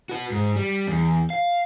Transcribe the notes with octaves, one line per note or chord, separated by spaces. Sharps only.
F#4 B4
G#2
G3
E2
F5